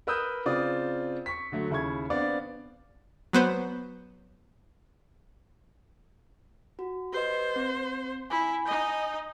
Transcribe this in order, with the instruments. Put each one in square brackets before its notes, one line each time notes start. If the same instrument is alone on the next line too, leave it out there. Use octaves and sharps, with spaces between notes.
[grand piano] A#4 B4 D#6 E6 G6
C#3 C4 F4 D5 D#6
C#6 B6
D3 F#3 A3
D#2 C#3 E4 B5 C#6 G#6
B3 C4 D4 D5 F5
[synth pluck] F#3 B3 C5
[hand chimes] F#4
[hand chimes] G4 B4 D#5 [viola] C5
[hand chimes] C4
[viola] E4 [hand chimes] G#5
[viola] D#4 D#5 [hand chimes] G#5 G6